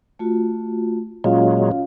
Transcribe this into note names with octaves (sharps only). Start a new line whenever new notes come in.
A3 F4 F#4
A#2 F#3 G#3 C#4 F4 F5